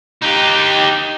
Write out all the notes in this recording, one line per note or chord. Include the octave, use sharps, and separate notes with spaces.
D#4 G4